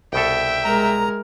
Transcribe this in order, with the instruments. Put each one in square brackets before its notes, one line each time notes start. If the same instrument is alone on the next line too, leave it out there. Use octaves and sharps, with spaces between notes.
[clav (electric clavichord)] C2 B2 A4 [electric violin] E5 G5
[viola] G#3 A#4 [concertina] A#5